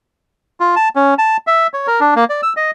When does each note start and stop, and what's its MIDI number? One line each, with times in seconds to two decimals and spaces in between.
0.60 0.75 65
0.76 0.89 81
0.96 1.14 61
1.18 1.37 81
1.47 1.67 76
1.74 1.87 73
1.87 2.00 70
2.00 2.14 62
2.16 2.24 58
2.29 2.41 74
2.43 2.53 88
2.57 2.71 75